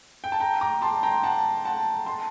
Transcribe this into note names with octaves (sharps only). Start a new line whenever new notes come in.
G5
A5
G5 A#5
A#5 D6
A5 C6
G5 A#5
F#5 A5
F#5 A5
A5 C6